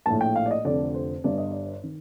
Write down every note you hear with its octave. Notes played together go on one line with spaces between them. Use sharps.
A#1 A2 A5
G5
F5
D5
D#5
F1 F2 D3 D5
C5
G1 G2 D3 D5
D#5
D5
D#3